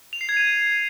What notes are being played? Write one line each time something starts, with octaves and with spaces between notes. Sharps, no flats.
F7
C7
G#6
D#7